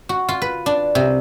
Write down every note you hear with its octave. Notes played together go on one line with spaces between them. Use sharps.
F#4
F4
B4
D4
C3